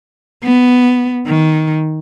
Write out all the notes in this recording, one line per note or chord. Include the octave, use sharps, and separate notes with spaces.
B3
D#3